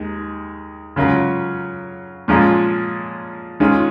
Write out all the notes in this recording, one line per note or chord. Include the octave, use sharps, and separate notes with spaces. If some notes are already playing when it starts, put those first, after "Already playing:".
Already playing: D#2 D#3 G#3
C#3 F#3 C#4 F4 A#4
A#2 F3 G#3 C#4 F4
D#3 G#3 C#4 F4